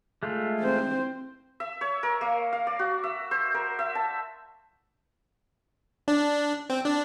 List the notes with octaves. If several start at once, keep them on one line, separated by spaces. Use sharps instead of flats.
G#3 A3 F4
C4 C5
E5
C#5
A#4
A#3
F5
D5
F#4
E5
C5
A#4
E5
A5
D4
C4
D4